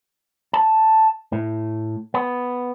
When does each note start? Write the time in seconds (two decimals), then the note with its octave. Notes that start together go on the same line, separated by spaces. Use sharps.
0.53 A5
1.32 A2
2.14 B3